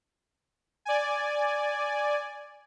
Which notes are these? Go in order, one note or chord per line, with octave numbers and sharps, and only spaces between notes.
D5 G#5